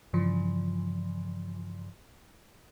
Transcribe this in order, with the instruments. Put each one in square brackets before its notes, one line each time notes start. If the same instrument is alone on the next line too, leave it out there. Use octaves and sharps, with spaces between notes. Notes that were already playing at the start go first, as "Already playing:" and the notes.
[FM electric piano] G2 C#3 E3 F3